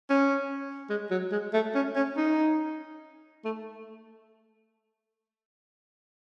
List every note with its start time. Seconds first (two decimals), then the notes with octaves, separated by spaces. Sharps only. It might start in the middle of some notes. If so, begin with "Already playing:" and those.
0.10 C#4
0.90 G#3
1.11 F#3
1.32 G#3
1.54 A3
1.75 C#4
1.96 C#4
2.17 D#4
3.45 A3